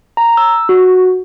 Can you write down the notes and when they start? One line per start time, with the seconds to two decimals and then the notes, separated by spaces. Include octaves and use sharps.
0.17 A#5
0.37 E6
0.69 F#4